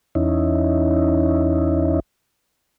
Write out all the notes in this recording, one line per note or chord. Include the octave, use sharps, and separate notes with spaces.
E2 C#4 D#4 E4